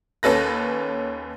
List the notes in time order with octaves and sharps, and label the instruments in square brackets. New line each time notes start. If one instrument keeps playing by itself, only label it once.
[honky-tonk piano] D#2 C#4 A4 B4 A#6